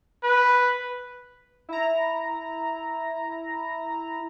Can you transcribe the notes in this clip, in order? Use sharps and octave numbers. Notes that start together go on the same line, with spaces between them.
B4
E4 A#5